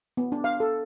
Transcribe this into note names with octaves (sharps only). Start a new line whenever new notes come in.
B3
D4
F5
A4